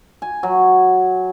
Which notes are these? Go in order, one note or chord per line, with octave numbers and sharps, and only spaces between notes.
G#5
F#3